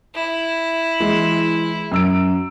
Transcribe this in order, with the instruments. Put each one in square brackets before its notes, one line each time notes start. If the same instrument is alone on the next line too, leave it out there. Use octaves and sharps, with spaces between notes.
[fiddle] E4
[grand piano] E3 G#3
F#2 E6 D7